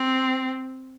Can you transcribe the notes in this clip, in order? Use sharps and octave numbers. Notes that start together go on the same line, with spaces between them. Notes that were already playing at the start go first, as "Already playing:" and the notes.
Already playing: C4